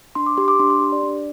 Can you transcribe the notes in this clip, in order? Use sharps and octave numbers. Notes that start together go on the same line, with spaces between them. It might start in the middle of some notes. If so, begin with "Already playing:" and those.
D4 C6
D6
G4 C6
D6
D4 C6
C6
G4
D5
D4